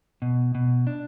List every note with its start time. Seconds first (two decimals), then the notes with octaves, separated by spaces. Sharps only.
0.22 B2
0.55 B2
0.87 D4